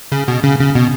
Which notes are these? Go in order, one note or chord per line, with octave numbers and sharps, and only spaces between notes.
C#3
B2
C#3
C#3
B2